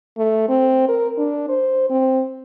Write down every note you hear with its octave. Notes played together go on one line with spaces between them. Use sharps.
A3
C4
A#4
D4
C5
C4